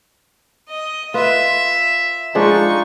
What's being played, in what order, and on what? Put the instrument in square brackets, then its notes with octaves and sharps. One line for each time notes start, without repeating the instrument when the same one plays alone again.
[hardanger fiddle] D#5
[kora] F4 B4 [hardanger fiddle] E5
[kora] F3 G#3 D4 [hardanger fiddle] D#4 C#6